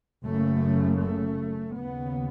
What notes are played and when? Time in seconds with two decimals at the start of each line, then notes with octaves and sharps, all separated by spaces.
0.25 F#1 F#2 C#3 A3
1.00 A3
1.75 D#2 C#3 B3